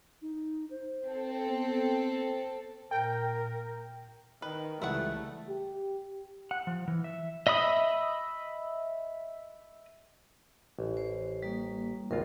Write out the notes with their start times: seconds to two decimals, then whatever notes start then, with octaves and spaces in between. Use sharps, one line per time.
0.22 D#4
0.71 C5
1.06 C4 A4
1.48 B3
2.91 A#2 A#4 G5
4.42 D#3 B4
4.82 C#2 E3 G3 A3 E4 G#4 F#5
5.49 G4
6.51 F#5
6.67 F3
6.88 E3
7.04 E5
7.47 D#5 E5 B5 D#6
10.79 A1
10.97 C5
11.43 G3 A#3
12.11 G#1 C#2 F4 A#4